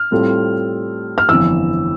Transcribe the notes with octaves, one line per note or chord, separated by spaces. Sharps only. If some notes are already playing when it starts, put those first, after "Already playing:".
Already playing: F6
A2 G3 C4 F4 A4
F6
G1 F2 E3 E6